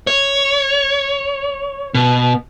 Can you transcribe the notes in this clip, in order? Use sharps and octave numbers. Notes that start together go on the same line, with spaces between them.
C#5
B2